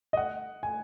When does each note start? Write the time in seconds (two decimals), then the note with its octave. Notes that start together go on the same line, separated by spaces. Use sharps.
0.13 D#5
0.17 F#5
0.63 G#5